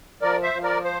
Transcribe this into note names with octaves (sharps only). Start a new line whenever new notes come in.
F3 A#4 D5
C5 E5
F3
A#4 D5
C5